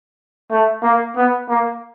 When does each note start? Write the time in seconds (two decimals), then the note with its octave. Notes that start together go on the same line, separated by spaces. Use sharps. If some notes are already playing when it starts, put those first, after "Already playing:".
0.50 A3
0.82 A#3
1.16 B3
1.49 A#3